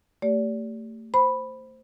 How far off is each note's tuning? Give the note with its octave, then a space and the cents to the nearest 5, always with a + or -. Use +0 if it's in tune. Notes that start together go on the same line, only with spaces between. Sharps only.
A3 +30 G4 +0 D5 -30
C5 +0 B5 +0